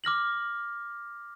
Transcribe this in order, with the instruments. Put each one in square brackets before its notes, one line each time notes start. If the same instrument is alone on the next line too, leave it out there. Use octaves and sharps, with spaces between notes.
[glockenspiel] D6 F6 A#6 F#7